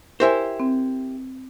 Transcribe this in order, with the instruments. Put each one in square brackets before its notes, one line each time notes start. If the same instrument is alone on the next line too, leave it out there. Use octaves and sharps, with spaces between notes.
[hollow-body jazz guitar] E4 G4 C5 [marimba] A#4 E5 G#5
[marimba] C4